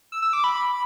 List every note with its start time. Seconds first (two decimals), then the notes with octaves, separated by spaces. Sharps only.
0.12 E6
0.22 E6
0.33 D6
0.44 B5